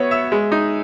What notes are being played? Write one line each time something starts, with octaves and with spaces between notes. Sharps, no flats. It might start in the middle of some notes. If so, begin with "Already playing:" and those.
Already playing: B3 F#4 C#5 E5
E5
G#3
D#4